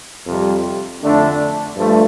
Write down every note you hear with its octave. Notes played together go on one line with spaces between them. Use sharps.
F2 C3 G3
F2 D3 A3 D4
G2 F3 A3